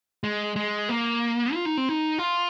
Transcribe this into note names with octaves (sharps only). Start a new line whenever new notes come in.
G#3
G#3
A#3
F4
D#4
C4
D#4
F4